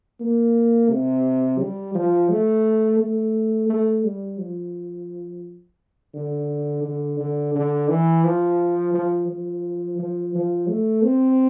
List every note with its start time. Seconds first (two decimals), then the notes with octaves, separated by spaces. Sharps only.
0.20 A#3
0.90 C3
1.59 G3
1.94 F3
2.29 A3
3.00 A3
3.69 A3
4.04 G3
4.39 F3
6.14 D3
6.84 D3
7.19 D3
7.55 D3
7.89 E3
8.24 F3
8.94 F3
9.29 F3
9.98 F3
10.35 F3
10.69 A3
11.04 C4